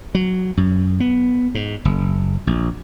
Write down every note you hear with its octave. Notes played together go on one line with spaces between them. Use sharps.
F#3
F#2
B3
G#2
F#1
A#1